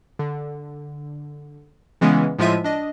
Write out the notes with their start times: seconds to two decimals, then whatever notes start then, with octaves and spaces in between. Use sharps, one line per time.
0.19 D3
2.01 C#3 E3 G#3 B3 C#4
2.39 A2 F3 G#3 F4 E5 D#7
2.64 D4 D#5